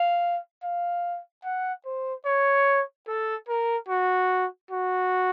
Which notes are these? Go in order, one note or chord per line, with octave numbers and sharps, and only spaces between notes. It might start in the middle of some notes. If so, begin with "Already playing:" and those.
Already playing: F5
F5
F#5
C5
C#5
A4
A#4
F#4
F#4